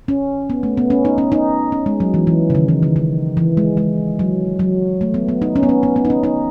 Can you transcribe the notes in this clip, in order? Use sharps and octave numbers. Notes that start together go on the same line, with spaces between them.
C#4
B3
A3
B3
C#4
D#4
C#4
D#4
C#4
G#3
F#3
E3
E3
C#3
D#3
E3
D#3
D#3
E3
G#3
G#3
F#3
F#3
A3
B3
B3
D#4
C#4
B3
C#4
B3
B3
D#4
C#4
D#4